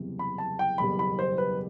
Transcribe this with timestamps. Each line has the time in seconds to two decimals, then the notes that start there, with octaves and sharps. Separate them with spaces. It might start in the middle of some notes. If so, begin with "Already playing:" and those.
Already playing: F#1 E2 C3 E3 G3
0.19 B5
0.38 A5
0.59 G5
0.78 F#1 E2 B2 G3 B5
0.99 B5
1.19 C5
1.38 B4